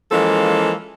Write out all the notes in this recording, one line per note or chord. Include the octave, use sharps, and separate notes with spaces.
E3 F3 G#3 A#3 C#4 A4